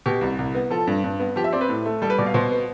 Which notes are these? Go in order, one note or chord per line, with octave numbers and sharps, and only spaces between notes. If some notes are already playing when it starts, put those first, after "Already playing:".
B2 G4
C2
C2
B3
F3 A4
G2
G2
B3
F3 G4
E5
C4 D5
B4
A2
A3
G3 A4
B4
B2 D5
F5
B2 C5
B3